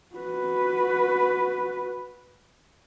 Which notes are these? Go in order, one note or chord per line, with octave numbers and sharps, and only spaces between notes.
F#4 B4